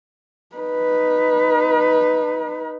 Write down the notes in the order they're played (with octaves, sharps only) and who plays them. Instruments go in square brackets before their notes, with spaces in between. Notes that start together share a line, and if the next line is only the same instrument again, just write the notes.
[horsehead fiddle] D#4 B4